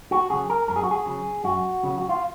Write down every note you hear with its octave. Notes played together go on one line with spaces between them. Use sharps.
F#4
C#3 F#3 G#4
A#4
F#2 A#4
G#4
F#4
G#4
C#3 F#3
F#2 F#4
C#3 F#3
F#4
F4